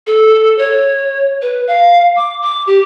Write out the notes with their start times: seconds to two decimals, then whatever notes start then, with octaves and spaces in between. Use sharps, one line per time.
0.07 A4
0.58 C#5
1.42 B4
1.68 F5
2.16 D6
2.42 D6
2.67 G4